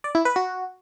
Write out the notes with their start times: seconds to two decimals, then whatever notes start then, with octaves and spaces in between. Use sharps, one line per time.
0.04 D5
0.15 E4
0.25 B4
0.36 F#4